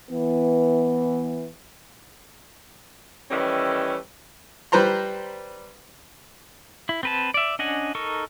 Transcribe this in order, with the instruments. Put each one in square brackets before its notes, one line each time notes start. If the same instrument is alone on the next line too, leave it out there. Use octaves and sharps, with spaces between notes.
[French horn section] E3 B3
[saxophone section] D#3 E3 G3 A3 C#4
[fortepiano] G3 B4 C5 A#5 C6
[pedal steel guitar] E4
C4 B4 A5
D5 E5
C#4 D4 D#5 F#5 G#5
D#4 A4 A#4 C#6